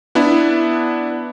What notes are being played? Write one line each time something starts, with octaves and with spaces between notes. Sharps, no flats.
B3 D4 E4